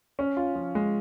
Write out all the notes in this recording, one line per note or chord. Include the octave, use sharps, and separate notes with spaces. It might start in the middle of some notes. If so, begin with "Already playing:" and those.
C#4
F4
F3
G#3